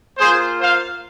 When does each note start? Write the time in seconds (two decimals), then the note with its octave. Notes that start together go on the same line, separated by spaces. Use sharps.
0.18 A#3 F4 G#4 C5
0.60 C5 F5